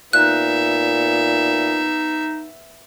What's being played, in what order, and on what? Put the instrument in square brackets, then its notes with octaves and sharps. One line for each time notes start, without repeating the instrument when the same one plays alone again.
[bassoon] A#2 [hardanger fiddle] B3 E5 [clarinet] D#4 [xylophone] F#6